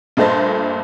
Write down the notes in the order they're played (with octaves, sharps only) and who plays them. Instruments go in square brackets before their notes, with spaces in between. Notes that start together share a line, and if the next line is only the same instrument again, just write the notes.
[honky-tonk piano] G2 A#2 A3 C5 D#5 A5